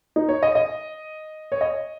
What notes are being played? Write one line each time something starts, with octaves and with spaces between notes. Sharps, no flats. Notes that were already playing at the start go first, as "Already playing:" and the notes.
D#4
C#5
D#5
D#5
C#5
D#5